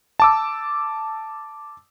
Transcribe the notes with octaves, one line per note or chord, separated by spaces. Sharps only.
A5 D6 E6